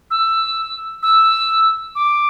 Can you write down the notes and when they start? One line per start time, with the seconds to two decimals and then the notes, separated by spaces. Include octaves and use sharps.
0.11 E6
1.03 E6
1.95 D6